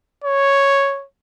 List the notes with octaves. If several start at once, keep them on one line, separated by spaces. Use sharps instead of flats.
C#5